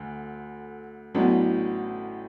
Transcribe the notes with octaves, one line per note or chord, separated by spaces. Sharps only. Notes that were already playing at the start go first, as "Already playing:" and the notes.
Already playing: D2 D3
A1 A2 F#3 B3 D4